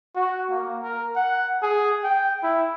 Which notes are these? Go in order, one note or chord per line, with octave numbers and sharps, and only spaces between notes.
F#4
A#3
A#4
F#5
G#4
G5
E4